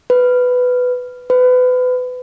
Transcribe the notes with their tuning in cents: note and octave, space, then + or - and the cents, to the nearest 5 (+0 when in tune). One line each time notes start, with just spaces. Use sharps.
B4 +10
B4 +30